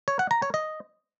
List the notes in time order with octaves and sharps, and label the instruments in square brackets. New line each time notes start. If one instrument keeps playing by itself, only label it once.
[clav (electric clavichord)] C#5
F#5
A#5
C#5
D#5